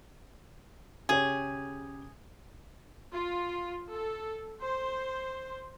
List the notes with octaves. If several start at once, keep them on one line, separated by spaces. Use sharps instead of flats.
C#3 G4 G#4 C#5
F4
A4
C5